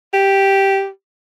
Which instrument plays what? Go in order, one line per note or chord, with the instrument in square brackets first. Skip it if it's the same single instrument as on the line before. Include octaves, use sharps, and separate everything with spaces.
[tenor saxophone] G4